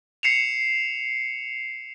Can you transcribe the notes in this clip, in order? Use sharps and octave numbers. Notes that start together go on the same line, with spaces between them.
C7 C#7 E7 F7